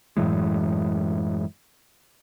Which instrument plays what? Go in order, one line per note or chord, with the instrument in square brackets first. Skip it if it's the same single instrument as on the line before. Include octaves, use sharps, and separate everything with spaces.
[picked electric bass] F#2 A2 E3 G#3